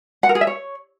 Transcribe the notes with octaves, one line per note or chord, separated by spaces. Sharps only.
F#5
A#4
G#4
E5
C#5